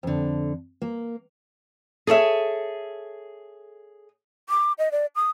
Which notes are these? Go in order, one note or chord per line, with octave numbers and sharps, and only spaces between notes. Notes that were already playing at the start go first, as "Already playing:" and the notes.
F2 D3
A#3
G#4 A4 C#5 E5
D6
D#5
D5
D#6